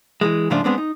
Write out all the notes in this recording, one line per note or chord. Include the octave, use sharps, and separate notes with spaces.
E3 F#3 G#3
G#2 C#3 F3 A3 D4 F4
G#3 B3 C4 D4
D#4